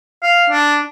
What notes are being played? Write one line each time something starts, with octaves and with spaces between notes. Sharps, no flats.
F5
D4